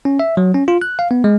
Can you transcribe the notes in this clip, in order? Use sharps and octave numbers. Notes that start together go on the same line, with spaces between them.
C#4
E5
F#3
C#4
F4
F#6
F5
B3
G#3